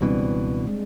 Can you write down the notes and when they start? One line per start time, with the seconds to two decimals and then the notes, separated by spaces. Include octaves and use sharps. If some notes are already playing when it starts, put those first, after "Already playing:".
0.01 C#2 B2 E3 G3 C4 D4
0.67 G#3